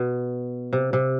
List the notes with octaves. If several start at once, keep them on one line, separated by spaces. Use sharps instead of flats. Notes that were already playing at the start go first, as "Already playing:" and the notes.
Already playing: B2
C3
C3